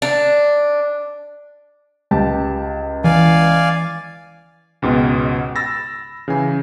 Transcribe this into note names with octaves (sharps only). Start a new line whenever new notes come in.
D4
C#2 G4 A5
E3 D5 F5 G#5
C#2 G#2 B2 B3
B5 E6 A6 A#6
C#3 E3 G#5